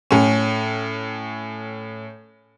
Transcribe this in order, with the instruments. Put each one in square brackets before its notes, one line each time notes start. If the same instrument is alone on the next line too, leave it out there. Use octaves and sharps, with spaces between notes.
[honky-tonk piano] A2 C#4